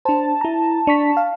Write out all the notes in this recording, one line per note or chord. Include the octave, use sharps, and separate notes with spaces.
D4 C5 A5
E4 A#5
D4 C#6 B6
F5